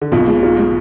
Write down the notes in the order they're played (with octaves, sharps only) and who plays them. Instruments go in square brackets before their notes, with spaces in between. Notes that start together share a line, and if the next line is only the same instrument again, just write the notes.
[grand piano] D3
[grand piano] B1 B2 [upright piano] F4
[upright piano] G#3
[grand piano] G#2 [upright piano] F4
[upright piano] G#3